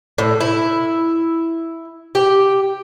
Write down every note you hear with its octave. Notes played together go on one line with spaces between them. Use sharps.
A2
E4
G4